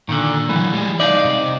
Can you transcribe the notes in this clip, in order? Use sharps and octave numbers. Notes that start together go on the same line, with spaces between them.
A#2 D3 D#3
E3 F#3 A3
G3 G#3
C2 D#4 D5 E5 F5
C3